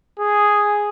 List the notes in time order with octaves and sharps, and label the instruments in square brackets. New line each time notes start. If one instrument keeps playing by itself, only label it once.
[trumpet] G#4